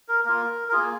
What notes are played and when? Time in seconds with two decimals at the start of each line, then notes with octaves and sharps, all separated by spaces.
0.08 A#4
0.25 A#3 F4 A#4
0.68 A#4
0.72 A#3 F4 G#4